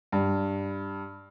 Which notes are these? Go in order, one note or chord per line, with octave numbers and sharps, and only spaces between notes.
G2